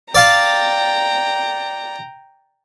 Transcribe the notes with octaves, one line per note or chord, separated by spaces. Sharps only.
D5 F5 G5 A5 A#5